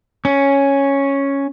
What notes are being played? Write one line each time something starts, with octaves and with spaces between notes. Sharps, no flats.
C#4